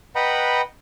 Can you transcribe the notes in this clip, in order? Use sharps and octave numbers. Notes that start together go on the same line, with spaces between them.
B4 D#5 F#5 G5 A#5 B5